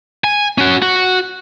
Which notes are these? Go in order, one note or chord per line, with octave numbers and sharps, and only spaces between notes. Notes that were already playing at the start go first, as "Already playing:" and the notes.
G#5
C#4 F#4
F#4